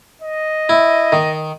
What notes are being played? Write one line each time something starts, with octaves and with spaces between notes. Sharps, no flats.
D#5
E4
D#3